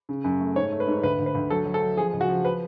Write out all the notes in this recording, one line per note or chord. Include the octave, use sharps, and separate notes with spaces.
C#3
F#2
A3
G#2 C#5
A3
B4
G#2
D2 B4
D2
B4
D2
F#3 A4
F#3
A4
F#3
F3 G#4
C#2
F#4
F3
B4